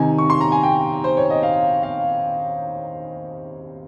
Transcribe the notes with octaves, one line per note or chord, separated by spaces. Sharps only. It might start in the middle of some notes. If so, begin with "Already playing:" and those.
Already playing: C3 D#3 G#5
C#6
C6
A#5
G#5
G5
C5
C#5
D#5
F5
F5